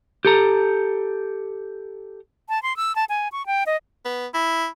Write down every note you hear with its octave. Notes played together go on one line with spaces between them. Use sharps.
G4 A4 A#5
A5
C6
E6
A5
G#5
C#6
G5
D#5
B3
E4